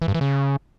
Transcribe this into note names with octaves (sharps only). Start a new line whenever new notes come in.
E3
G2
E3
C#3